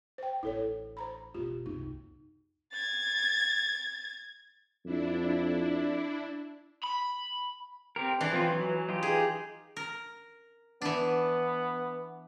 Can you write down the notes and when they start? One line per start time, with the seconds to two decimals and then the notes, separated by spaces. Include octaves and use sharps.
0.18 C5 G5
0.43 A1 D4 E4 A4 C#5
0.97 C5 A#5 B5
1.34 F#1 B2 F4 G4
1.66 F#1 C2 D#4
2.72 G#6 A6
4.85 F2 D4 E4
6.84 B5
7.96 C4 G4 A#4
8.21 E3 D4
8.32 F3 C4 F4
8.51 F#3
8.89 D#4 F4 G4
9.03 G#4
9.77 A#4
10.82 E3 B3 D4